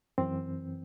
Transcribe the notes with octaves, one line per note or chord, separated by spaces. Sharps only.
F#2 E3 C4